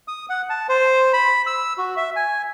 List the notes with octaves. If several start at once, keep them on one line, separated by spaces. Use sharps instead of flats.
D#6
F#5
A5
C5
B5
E6
F#4
E5
G#5